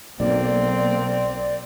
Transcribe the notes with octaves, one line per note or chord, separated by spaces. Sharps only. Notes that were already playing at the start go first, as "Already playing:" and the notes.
B1 A#3 C4 D5